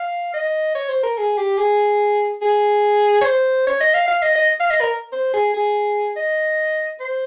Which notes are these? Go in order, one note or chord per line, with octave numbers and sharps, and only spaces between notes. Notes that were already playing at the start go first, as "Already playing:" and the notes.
Already playing: F5
D#5
C#5
C5
A#4
G#4
G4
G#4
G#4
C#5
C5
C#5
D#5
F5
F5
D#5
D#5
F5
D#5
A#4
C5
G#4
G#4
D#5
C5